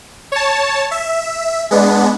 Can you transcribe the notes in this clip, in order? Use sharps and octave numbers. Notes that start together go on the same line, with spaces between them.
C#5 A5
E5
G#3 B3 D4